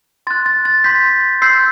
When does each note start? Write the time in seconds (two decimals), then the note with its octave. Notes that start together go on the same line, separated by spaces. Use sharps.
0.27 C6 F#6 A6
0.46 A6
0.65 A6
0.84 C6 G6 B6
1.42 C6 E6 G6 C7